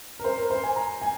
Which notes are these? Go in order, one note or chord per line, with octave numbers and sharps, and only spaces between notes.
A#4
C5
A#4
C5
G#5
A#5
G#5